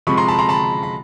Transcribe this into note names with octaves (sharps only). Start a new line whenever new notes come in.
C3 F3 G#3 B5 C#6
A#5 C6
A5 B5
A#5 C6
A5 B5
B5